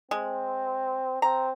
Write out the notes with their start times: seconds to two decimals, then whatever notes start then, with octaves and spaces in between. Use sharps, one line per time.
0.11 G#3 C4
1.22 C4 A#5